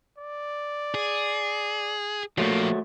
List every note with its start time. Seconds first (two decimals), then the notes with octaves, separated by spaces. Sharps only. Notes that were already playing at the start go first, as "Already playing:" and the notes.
0.18 D5
0.94 G#4
2.38 F3 F#3 A3 A#3